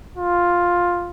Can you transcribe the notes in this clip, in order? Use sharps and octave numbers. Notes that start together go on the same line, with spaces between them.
F4